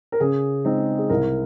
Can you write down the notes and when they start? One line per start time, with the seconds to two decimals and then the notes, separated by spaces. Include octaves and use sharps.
0.12 A#4
0.20 C#3 G#4
0.65 G#3 C4 D#4
0.99 G#4
1.09 C2 A#4